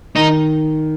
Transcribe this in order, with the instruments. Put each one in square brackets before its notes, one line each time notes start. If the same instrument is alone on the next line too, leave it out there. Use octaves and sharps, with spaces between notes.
[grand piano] D#3 [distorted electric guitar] D#4